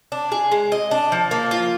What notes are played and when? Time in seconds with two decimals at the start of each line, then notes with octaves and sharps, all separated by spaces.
0.12 D4
0.32 G#4
0.52 G#3
0.72 D#5
0.91 D4
1.12 F3
1.31 A#3
1.51 F4